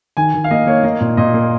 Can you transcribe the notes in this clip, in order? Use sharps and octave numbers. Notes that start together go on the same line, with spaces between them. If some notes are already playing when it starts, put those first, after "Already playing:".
D#3 G#5
D#3
F5
A#3 D#5
A#3 C#5
A#3 D#5
A#2
A#2 D#5
A#3